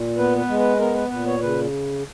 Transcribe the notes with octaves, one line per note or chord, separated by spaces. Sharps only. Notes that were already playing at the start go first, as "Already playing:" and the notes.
Already playing: A#2
B3 B4
B4
G#3
B4
B3 A#4
B4
A#2 B4
C#5
C#3 B4